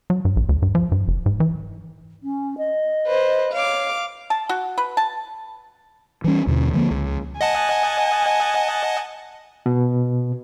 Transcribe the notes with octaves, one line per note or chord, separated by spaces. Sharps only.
F#3
G2
A#1
D2
G2
F3
G2
F#1
G#2
E3
C#4
D#5
B4 C5
C#5 F5 D6
A5
F#4
B4
A5
E3 G3 C#4
D#2 B2 D3
D3 F3 G#3 A#3
C#2
D#5 F#5 G#5 A5
B2